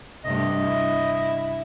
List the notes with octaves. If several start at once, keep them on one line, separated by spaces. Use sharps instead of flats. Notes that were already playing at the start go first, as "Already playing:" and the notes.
G2 C3 A3 D#5
E4